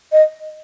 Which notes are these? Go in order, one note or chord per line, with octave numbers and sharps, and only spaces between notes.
D#5